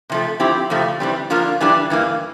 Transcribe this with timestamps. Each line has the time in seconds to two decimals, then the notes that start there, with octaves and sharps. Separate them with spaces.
0.10 C3 F3 A3
0.40 F3 C4 E4 G4
0.70 F2 C3 F3 A3
1.00 E3 G3 C4
1.30 F3 A#3 D4 F4 A#4
1.61 E3 G3 D4
1.90 G2 E3 A#3